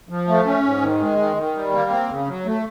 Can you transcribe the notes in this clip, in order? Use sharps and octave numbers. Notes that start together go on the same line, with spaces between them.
F3
A3
C#4
G#2
D#3
G#3
D#3
D#3
G3
A#3
C4
C#3
F#3
A3